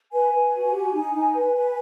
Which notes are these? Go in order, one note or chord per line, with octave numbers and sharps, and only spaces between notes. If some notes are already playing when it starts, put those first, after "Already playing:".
B4 G#5
B4
F#4
G4
D#4
D#4
B4
B4